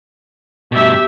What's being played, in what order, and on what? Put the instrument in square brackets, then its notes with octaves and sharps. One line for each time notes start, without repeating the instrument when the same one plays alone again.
[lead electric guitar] G2 B2 [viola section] G4 E5